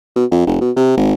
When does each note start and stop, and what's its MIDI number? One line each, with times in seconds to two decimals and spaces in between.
0.16 0.25 47
0.31 0.46 41
0.47 0.58 29
0.61 0.71 47
0.76 0.92 48
0.97 1.14 32